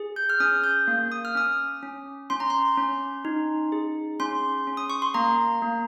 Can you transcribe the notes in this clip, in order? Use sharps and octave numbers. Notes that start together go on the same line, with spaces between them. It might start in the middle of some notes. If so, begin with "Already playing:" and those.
Already playing: G#4
G6
F6
C#4 D#6
G6
A#3
D#6
F6
C#4 D#6
C#4
C#4 C6
A#5
C6
C#4
D#4
G#4
C#4 C6
C#4
D#6
C#6
C6
A#3 A#5
A#3